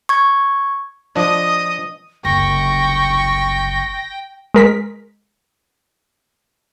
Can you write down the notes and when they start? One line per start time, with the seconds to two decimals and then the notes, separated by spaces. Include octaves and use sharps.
0.09 C#6 G#6
1.16 F3 D4 D#5 D#6
2.25 F#1 C2 G5 C#6 A#6
4.54 G#3 A#4 B6